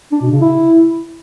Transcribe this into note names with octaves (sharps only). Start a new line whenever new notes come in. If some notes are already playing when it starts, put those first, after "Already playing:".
D4
B2
C#3
E4